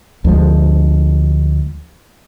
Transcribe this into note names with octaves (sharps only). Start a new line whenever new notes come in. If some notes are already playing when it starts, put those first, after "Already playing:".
D2 F3 G#3